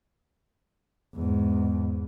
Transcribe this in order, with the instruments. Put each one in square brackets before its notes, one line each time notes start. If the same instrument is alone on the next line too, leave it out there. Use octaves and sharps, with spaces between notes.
[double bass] E2 G#2